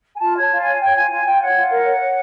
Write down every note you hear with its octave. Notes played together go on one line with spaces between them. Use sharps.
G#5
F4 A5
C#5 A5
F4
C#5 G#5
C#5 G5
F4 G#5
F4 G#5
F4 G5
C#5 F#5
F4
A#4
C#5
C#5